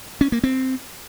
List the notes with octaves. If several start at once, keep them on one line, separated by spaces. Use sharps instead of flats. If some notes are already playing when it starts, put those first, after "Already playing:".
C#4
A#3
C4